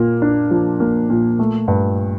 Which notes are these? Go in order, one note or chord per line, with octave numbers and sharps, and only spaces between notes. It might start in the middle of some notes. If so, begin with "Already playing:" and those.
Already playing: A#2 A#3
D4
F3
A#3
A#2
A3
G2